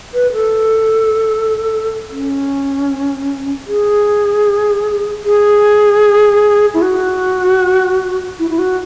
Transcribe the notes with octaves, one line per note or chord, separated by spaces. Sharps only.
B4
A4
C#4
G#4
G#4
E4
F#4
E4
E4
F#4